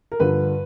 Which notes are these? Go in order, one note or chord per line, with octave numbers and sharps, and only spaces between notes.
A#4
G2 D3 F3 B4